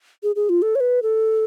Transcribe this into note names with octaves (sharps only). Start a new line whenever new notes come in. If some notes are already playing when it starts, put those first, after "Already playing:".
G#4
G#4
F4
A4
C#5
B4
A4